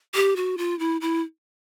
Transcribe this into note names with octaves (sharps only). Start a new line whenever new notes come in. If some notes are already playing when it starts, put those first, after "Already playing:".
G4
F#4
F4
E4
E4